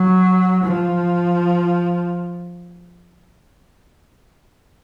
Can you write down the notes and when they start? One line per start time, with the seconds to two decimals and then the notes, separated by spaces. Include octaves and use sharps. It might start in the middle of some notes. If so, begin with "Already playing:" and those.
Already playing: F#3
0.64 F3